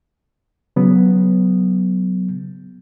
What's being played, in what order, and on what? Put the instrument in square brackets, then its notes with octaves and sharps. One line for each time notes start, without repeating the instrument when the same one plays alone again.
[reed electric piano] C#3 F#3 B3